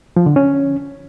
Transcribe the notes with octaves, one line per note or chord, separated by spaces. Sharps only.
F3
D3
C#4